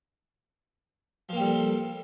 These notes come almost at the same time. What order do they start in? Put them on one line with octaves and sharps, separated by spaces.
F3 A#3 C4 G3 A4